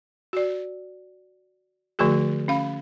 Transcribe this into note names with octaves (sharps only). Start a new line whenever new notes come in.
F#4 D5
D3 F3 A3 F#4 G#4
C#4 F5 B5